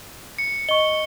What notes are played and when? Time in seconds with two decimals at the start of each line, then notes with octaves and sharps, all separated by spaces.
0.39 C#7
0.69 D#5 C#6 G7